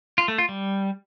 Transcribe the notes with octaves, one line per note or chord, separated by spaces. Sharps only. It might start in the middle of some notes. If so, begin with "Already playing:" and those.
F4
A3
F4
G3